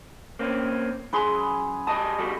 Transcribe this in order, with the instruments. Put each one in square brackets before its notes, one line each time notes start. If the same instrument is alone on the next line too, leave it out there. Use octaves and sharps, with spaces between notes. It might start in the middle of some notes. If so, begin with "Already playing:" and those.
[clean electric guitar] A#3 C4 C#4
[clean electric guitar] F#2 C6 [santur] G#4 B4
[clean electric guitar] G3 D#5 A5 [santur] D#6
[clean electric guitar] G3 F#4 A4